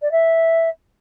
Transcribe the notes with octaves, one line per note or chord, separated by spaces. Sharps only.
D5
E5